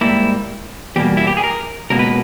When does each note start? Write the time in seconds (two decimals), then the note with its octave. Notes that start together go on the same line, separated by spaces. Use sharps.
0.01 G#2 G3 A#3 E4
0.96 E2 B2 G3 A#3 G4
1.17 E4
1.27 G4
1.37 G#4
1.44 A#4
1.90 C#2 B2 A#3 A#4
1.99 B4